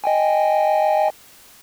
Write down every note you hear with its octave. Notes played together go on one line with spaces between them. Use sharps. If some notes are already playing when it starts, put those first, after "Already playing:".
D#5 G5 G#5